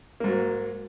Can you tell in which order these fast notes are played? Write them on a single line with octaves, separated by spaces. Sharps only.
A#3 G#2 F#3